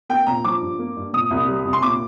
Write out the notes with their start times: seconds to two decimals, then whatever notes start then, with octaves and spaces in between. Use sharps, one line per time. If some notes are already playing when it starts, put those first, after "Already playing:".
0.09 A#3 G5
0.27 A#2 A#5
0.44 F3 D6
0.61 G2
0.79 A#3
0.97 G2
1.13 A#2 D#6
1.31 C2
1.48 G3
1.65 C2
1.73 C6
1.82 A#2 D6